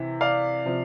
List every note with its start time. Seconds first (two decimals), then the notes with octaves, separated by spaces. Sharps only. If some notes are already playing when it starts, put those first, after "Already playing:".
Already playing: C3 E3
0.21 D5 F5
0.65 C3 F3